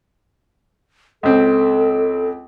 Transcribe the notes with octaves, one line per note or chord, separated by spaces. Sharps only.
C#2 C4 A4